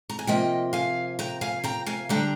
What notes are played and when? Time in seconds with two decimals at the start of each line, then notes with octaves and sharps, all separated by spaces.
0.09 A#5
0.19 G#5
0.27 C3 F3 A#3 D#5 G5
0.73 F5 G#5
1.19 G5 A#5
1.41 F5 G#5
1.64 G5 A#5
1.86 F5 G#5
2.09 D3 G3 D4 G5 A#5